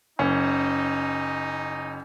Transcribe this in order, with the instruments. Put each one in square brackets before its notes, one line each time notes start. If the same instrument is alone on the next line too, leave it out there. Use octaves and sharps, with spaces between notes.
[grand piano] F#1 [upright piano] C#4 [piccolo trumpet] D#4